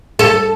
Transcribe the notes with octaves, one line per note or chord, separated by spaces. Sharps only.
A4